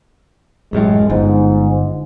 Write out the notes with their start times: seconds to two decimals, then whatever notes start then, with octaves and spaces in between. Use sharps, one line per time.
0.73 A1 F#2 A2 G#3
1.10 G1 G#2